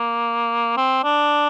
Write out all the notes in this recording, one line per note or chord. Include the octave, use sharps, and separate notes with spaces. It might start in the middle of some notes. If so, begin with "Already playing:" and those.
Already playing: A#3
C4
D4